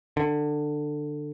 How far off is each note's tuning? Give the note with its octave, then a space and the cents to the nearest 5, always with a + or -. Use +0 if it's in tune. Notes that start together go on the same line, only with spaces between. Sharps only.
D3 +20